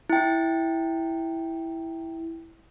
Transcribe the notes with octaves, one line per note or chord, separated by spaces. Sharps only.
E4 G5